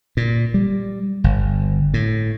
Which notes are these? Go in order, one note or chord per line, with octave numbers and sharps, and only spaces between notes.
A#2
G3
G1
A2